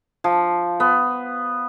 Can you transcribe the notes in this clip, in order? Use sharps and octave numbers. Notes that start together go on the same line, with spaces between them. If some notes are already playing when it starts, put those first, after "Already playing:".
F3
B3